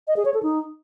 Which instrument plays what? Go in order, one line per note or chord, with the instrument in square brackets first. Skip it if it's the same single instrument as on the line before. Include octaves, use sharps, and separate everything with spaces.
[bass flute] D#5
G#4
C#5
A4
D#4